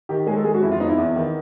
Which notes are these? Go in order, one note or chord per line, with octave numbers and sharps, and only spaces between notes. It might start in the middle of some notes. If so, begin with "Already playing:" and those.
D#3 G4
G#3 G#4
A4
G#3 G#4
F#4
F2 E4
F4
B3 D#4
E4
E2
D#3